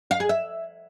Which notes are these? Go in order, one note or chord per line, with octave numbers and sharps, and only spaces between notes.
F5
G#4
E5